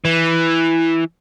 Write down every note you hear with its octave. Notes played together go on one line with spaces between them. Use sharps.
E3